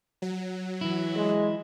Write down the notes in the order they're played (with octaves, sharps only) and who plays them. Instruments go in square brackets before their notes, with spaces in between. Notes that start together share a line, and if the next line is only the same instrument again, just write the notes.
[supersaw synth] F#3
[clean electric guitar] E3 E4
[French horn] G#3